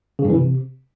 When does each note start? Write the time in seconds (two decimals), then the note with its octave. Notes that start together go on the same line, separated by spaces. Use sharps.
0.19 C#3
0.24 G2
0.30 E3
0.35 C3